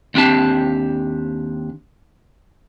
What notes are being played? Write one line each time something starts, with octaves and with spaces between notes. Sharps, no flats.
D#2 C4 D4 G4 A5